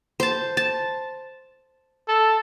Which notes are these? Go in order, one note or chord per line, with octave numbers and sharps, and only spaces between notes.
C5 A5
A5
A4